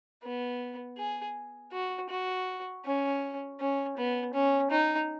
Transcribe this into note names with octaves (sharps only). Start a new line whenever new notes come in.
B3
G#4
F#4
F#4
C#4
C#4
B3
C#4
D#4